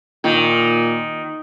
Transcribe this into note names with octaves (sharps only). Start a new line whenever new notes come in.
A#2 D#3